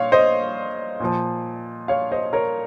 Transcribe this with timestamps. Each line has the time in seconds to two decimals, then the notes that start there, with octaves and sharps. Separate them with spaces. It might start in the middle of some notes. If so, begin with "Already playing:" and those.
Already playing: A#2 C#5 F5
0.12 C5 D#5
1.00 A#2 F3
1.88 C#5 F5
2.12 C5 D#5
2.33 A#4 C#5